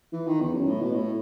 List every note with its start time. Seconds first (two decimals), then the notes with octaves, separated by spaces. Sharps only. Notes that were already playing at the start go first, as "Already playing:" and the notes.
0.13 E3
0.27 D#3
0.41 E2
0.54 F#2
0.67 A2
0.81 B2
0.94 A2